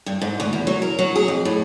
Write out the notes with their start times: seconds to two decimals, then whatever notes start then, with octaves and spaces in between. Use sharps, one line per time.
0.06 G2
0.21 G#2
0.40 D2
0.53 E2
0.67 F#3
0.82 A#4
0.99 F#3
1.16 G#4
1.28 F2
1.45 A2